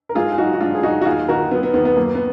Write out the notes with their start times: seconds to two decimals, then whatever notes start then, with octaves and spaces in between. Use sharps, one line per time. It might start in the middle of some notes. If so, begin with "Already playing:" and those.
0.09 A#4
0.15 G#2 F4 G#4
0.32 G#4
0.38 F#3 D#4 F#4
0.53 F#4
0.60 G#2 D4 F4
0.75 G#4
0.83 F#3 D#4 F#4
1.01 F#4
1.05 D#2 F4 G#4
1.28 D#3 F#4 A#4
1.51 F#3 B3
1.63 B3
1.74 D#2 B3
1.85 B3
1.96 F#2 A#3
2.15 B3